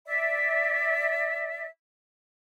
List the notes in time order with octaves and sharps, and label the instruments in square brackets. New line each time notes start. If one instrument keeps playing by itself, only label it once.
[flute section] D5 E5